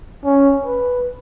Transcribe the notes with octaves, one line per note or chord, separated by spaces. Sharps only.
C#4
B4